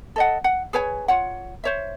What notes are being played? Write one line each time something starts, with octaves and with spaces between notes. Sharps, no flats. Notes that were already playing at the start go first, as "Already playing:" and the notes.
A4 D#5 F#5
F#5
G#4 B4 C#5 G#5
F4 C#5 F#5
C5 C#5 E5